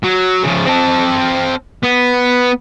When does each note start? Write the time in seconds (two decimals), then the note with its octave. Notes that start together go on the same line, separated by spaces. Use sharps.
0.03 F#3
0.43 C#3 F3
0.66 C4 A5
1.84 B3